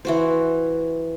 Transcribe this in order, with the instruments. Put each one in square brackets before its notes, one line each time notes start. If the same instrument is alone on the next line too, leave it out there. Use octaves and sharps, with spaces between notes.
[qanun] E3 F#4 C5